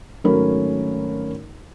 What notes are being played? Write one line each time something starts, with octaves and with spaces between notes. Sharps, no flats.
G#1 F#3 A3 C#4 A#4 B5